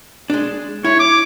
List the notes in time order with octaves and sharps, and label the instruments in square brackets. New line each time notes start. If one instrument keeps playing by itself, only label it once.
[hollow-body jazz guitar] G#3 D4
[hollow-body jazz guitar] E4 [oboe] C#5
[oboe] D6